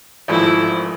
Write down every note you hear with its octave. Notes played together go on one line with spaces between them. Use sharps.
G#1 G#2 F3 A3 E4